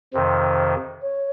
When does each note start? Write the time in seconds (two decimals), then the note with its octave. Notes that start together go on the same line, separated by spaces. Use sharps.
0.13 F2 C3 D#3 C5
1.02 C#5